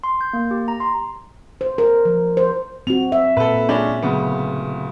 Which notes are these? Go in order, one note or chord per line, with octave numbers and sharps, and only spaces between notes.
C6
G6
A#3
G4
A#5
C6
C5
A#4
F3
C5
C4 F#4 F7
E5
A#2 A4 B4
G#3 C#4 D4
D1 C#3 B3